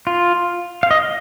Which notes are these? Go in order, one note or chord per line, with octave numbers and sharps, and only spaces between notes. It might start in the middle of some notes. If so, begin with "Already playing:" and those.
F4
F5
D#5